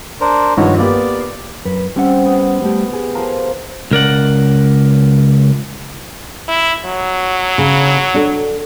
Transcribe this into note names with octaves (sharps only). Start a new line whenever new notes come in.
D4 A#4 C5
G2 D#3 F3 F#4 C#5
A#3 B3 G4 D5
F#2 B4
G3 C4 C#4 F#5
B3
G3 A3 G4
G4 G#4
F3 A#4 C5
C#2 A#4 D5 F#5
E4
F#3
C#3
D4 A4